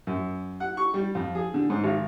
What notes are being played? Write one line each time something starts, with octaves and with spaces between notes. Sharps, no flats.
F#2
F#5
C#6
G3
F2
G#4
D3
G#2
G#1